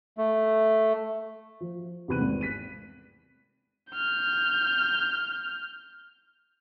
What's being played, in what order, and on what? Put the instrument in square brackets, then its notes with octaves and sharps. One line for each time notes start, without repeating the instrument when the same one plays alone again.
[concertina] A3
[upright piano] F3
E2 C3 B3 B5 F#6 D#7
G#1
F#6 B6 D#7
[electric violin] F6 G6